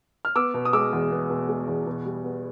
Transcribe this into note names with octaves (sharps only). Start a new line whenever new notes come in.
F6
B3 D6 E6
B2
D#6
G#3 D6 E6
E2
B3
B2
G#3
E2
B2
G3
B3